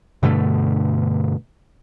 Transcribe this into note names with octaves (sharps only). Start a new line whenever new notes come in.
G2 B2 D3 A3